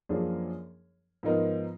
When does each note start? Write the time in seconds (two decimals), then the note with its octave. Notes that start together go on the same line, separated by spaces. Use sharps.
0.09 F#2 F3 A#3 D4 G#4
1.23 G#2 F3 B3 D#4 A#4